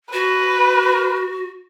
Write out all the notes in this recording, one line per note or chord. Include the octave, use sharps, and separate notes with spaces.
F#4 B4